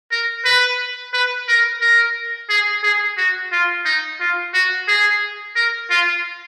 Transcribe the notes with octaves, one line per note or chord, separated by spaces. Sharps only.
A#4
B4
B4
A#4
A#4
G#4
G#4
F#4
F4
D#4
F4
F#4
G#4
A#4
F4